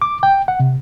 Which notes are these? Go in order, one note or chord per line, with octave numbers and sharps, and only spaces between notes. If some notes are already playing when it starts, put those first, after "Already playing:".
D6
G5
F#5
C3